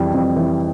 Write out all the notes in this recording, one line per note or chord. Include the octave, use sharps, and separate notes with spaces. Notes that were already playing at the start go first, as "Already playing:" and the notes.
Already playing: F2 E3 G3
F2
E3 G3